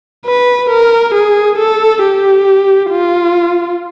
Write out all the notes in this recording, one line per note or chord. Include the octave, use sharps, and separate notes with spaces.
B4
A#4
G#4
A4
G4
F4